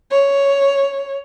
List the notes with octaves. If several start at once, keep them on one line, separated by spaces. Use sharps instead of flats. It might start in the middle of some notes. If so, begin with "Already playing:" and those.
C#5